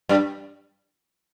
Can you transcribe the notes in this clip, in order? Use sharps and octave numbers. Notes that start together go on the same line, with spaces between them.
G2 G3